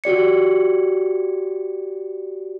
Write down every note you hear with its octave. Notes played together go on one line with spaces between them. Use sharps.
F#4 G4 D5 C#7